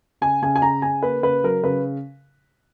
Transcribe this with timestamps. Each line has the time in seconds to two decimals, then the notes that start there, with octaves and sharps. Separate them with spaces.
0.21 C#3 G#5
0.42 C#3 G#5
0.56 G#5
0.62 C#3 A#5
0.82 C#3 G#5
1.03 A#3 B4
1.23 C#3 B4
1.44 F#3 A#4
1.64 C#3 B4